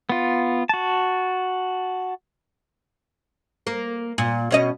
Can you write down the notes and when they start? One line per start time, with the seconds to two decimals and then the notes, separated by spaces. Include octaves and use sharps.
0.09 B3 F4
0.69 F#4 A5
3.67 A#3
4.18 A#2
4.51 B2 C#4 D#5